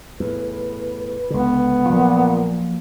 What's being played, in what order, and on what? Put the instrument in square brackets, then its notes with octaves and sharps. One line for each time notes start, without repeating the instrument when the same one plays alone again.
[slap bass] E2 A2 [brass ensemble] B4
[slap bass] C#2 D3 [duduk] B3
[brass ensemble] A#2 [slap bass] F3 F#3 A#3